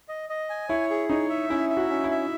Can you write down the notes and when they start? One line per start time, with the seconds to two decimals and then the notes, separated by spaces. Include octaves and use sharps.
0.09 D#5
0.29 D#5
0.50 G#5
0.69 E4 C#5
0.90 G#4
1.10 D#4 C#5
1.30 E5
1.50 C#4 E4
1.70 E5
1.77 F#4
1.90 C#4
2.04 E4
2.11 E5